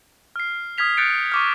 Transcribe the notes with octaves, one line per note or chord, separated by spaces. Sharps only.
F6 C7
D#6 F6 G#6 B6 F7
F#6 G6 A6 C#7 D7
C#6 D6 F6